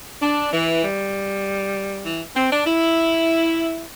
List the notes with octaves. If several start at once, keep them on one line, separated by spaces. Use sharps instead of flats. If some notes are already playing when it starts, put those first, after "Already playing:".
D4
E3
G3
E3
C4
D4
E4